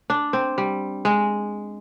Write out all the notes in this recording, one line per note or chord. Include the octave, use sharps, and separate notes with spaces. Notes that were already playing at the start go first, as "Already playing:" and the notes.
D4
C4
G3
G#3